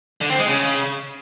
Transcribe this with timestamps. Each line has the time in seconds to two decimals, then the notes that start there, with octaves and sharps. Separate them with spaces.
0.21 D3
0.30 C4
0.39 G#3
0.48 C#3